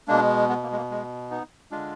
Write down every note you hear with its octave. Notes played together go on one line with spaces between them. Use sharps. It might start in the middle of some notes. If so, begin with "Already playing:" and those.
B2 G#3 A#3 D4
G#3 B3
A#3
G#3
A#3
G#3
B3 D#4
D3 G#3 D4 F4